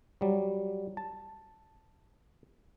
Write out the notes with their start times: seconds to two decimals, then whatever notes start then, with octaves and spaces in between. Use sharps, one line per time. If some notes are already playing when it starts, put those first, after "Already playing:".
0.21 F#3 G3
0.97 A5